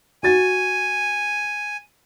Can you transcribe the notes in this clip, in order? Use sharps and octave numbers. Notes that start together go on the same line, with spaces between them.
F#4 G#5 A6